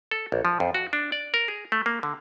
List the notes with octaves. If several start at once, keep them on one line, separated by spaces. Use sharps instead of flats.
A4
A#1
F3
F2
F#4
D4
D5
A#4
G#4
A3
A#3
D3